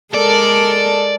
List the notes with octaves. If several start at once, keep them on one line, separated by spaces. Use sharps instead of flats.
G#3 A4 A#4 D5